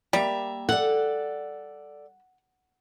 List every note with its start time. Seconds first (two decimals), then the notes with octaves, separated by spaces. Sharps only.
0.13 G3 A#3 E5 A#5
0.69 A4 D5 F#5